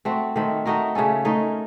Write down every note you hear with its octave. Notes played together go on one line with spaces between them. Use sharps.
A3 C4 F#4
D#3 A3 C4
A3 D#4 F#4 A#4
C#3 A3 C#4 A4
A3 D#4 A#4 C#5